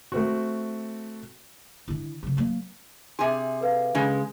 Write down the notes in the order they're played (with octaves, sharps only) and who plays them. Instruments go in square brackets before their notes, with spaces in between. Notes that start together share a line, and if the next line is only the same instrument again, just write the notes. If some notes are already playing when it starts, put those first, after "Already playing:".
[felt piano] A3 C4 F#4
[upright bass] D3 E4
C#3 F#3
F#3 A#3
[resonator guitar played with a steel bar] C3 G#4 [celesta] E5 G#5 C6
[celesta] A4 B4 F5
[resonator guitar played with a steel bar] C#3 G#3